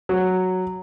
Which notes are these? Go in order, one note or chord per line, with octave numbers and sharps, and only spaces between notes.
F#3